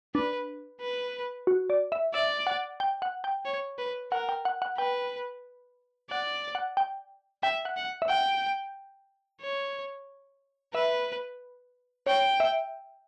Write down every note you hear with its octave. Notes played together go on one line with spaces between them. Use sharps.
D4 B4
B4
F#4
D5
E5
D5 E5
F#5
G5
F#5
G5
C#5
B4
A#4 F#5
G5
F#5
F#5
B4 G5
D5 F#5
F#5
G5
E5 G5
F#5
F#5
E5
F#5 G5
C#5
B4 E5
C#5 G5
E5